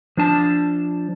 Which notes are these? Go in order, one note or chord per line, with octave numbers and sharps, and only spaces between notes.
F3 D4 A5